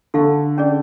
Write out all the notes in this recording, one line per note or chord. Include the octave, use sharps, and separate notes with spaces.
D3 A4 F5 A5 C#6
C#4 G#4 D5